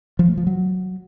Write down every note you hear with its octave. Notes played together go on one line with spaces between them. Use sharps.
F3
A3
F3
F#3